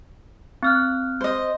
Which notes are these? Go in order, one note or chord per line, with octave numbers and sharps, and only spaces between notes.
C4 F6 F#6
C5 D#5